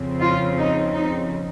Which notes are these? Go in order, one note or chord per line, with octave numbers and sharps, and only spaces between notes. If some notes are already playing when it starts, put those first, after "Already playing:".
Already playing: F2 C#3 F3 C4
F4
D#4
D#4